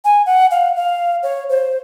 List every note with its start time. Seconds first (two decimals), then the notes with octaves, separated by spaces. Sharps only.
0.05 G#5
0.26 F#5
0.51 F5
0.76 F5
1.23 C#5
1.49 C5